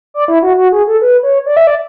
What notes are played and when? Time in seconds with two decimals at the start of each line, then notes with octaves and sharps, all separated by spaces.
0.14 D5
0.28 E4
0.43 F#4
0.58 F#4
0.72 G#4
0.87 A4
1.02 B4
1.23 C#5
1.46 D5
1.57 E5
1.67 D5